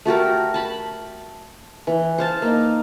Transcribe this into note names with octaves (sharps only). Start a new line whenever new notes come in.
A3 F#4 G4 A#4
A5 B5
E3
C5 F5 A5
A#3 D#4